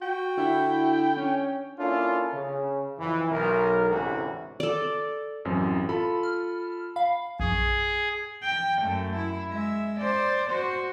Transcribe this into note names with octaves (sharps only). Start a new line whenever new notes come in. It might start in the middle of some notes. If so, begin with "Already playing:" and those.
F#4 G5
D3 E4
C#4
A#3 C#4 D4 E4 F4 A4
C#3
F2 E3
B1 A#4
A1 D2 G#2 C3 E3 F#4
A4 D5
A1 F#2 C4
F4 A4 B5
F6
F5 B5
A#1 F#2 G#4 C#6
G5
F#2 A3
E4
G#3 E5
C5 D5
F#4 C5